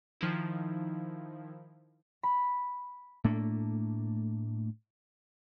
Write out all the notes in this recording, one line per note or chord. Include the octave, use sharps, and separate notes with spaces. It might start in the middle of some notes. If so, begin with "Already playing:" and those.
D#3 F3 D#4 E4
B5
A2 A3 A#3 D4